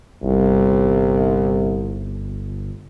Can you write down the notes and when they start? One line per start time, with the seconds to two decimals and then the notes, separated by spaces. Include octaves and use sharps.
0.23 G1 C2